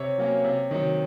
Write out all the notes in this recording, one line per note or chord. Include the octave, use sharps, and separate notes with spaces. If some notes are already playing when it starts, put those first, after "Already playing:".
Already playing: C3 C#5
F#3 A#3 C#4
C3
D#3 F#3